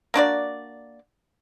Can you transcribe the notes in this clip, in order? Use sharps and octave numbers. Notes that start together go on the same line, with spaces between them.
A#3 D4 F#4 D5